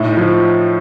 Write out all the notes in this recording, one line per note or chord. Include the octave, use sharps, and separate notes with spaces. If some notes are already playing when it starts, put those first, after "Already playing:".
Already playing: A2 D#4
F3